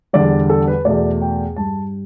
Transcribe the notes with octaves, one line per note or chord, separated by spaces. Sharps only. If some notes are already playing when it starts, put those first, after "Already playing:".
E2 D3 G3 D5
A4
B4
E2 B2 A3 D5
G5
G2 G3 A5